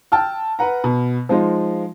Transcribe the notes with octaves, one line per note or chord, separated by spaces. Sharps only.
G5 A5 E6 F6
B4 F#5 A#5
B2
F3 G#3 D#4 F4